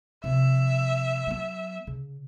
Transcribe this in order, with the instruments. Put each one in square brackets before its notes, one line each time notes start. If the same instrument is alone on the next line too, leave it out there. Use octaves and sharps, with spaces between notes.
[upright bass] C3 F3 [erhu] E5
[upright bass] F#3 B3
C#3